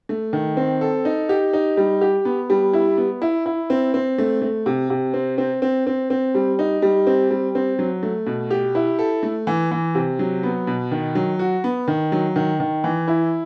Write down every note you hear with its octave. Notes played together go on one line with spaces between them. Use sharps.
A3
D#3
C4
A4
D#4
G4
D#4
G3
G4
B3
G3
E4
B3
E4
E4
C4
C4
A3
A3
C3
C3
C4
C4
C4
C4
C4
G3
D#4
G3
C4
G3
C4
F#3
A3
B2
G4
E4
A4
A3
E3
E3
C3
F#3
B3
B2
D#3
F#3
F#4
B3
D#3
F#3
D#3
D#3
E3
E4